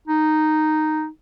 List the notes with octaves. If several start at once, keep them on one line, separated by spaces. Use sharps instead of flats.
D#4